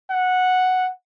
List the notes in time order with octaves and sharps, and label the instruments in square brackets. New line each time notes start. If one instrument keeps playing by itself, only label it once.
[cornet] F#5